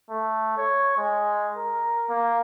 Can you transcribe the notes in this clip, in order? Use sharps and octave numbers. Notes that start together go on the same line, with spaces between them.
A3
C#5
G#3
A#4
A#3